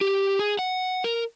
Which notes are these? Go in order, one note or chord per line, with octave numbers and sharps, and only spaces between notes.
G4
G#4
F#5
A#4